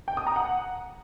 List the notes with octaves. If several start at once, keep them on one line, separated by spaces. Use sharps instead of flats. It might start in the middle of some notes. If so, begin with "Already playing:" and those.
G5
D#6
A#5
F#5